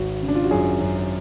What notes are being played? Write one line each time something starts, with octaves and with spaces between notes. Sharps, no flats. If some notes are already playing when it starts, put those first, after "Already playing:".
Already playing: G#1 F#4
C#3
D4
F4
F#4
F#2 G#4
F#2